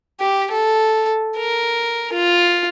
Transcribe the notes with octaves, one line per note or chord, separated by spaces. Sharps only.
G4
A4
A#4
F4